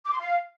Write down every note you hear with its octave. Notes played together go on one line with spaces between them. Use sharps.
D6
C6
F5